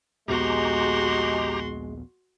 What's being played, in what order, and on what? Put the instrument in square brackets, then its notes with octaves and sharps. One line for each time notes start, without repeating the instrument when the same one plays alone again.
[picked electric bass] A#1 D#2 B3 [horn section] G#3 [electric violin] F#4 C6 [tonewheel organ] G4 A#5